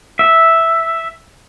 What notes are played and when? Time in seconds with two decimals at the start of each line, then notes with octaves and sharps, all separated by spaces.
0.19 E5